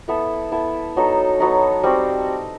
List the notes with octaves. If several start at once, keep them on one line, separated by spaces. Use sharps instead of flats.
B3 E4 A4 E5
B3 E4 A4 E5
F#3 B3 D#4 A4
F#3 B3 D#4 A4
G3 C4 F#4